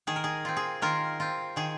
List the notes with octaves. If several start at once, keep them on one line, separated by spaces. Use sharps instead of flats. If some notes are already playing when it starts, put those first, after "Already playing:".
D#3 G#4
A#4
G#4
C4 F4
G#4
D#3 F4 A#4
C4 F4
D#3 G#4